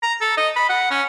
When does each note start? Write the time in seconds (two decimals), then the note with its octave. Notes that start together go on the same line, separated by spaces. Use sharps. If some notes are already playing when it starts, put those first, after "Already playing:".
0.02 A#5
0.21 A4
0.37 D#5
0.56 B5
0.69 F#5
0.91 C#4